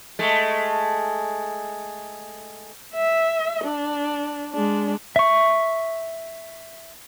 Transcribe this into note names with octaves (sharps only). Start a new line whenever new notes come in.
G#3 A3
E5
D4
G#3 D4
E5 C#6